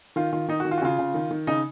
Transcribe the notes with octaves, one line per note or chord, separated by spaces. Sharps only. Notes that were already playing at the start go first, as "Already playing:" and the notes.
D#3 F4
D#3 F4
D#3 D#4
F#4
D#3
F4
F#4
C#3 F4
C#3
D#3
D#3
C#3 D#4